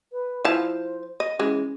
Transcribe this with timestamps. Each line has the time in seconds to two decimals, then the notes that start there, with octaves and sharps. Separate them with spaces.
0.12 B4
0.45 F3 E4 C5 A5
1.20 D#5
1.39 E3 G#3 C#4